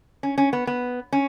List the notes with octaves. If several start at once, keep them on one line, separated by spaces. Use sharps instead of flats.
C#4
C#4
B3
B3
C#4